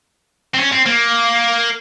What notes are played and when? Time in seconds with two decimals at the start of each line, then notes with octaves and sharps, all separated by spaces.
0.54 C4
0.59 C#4
0.72 C4
0.86 A#3